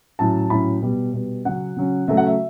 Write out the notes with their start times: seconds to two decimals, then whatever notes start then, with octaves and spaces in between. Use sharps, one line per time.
0.19 A2 F#3 C#4 A5
0.50 A2 F#3 C#4 B5
0.82 B2 G3 B3
1.13 B2 G3 B3
1.45 C#3 F#3 C#4 F#5
1.77 C#3 F#3 C#4
2.08 C#3 F#3 A3 E5
2.17 F#5
2.27 E5